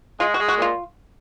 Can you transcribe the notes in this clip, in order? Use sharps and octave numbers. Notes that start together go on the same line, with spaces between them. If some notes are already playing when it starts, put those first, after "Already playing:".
G#3 F4
F#4
G#3
F#4
A#2 F4